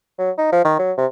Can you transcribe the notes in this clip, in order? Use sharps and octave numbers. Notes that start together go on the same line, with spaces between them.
F#3
D#4
F3
D#3
F#3
C3